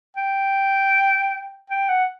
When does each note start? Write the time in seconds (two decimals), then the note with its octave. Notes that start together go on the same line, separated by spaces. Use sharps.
0.17 G5
1.70 G5
1.89 F#5